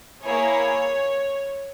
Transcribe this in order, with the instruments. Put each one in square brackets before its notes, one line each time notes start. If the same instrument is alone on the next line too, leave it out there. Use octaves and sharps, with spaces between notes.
[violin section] A#3 E4 G#4 C#5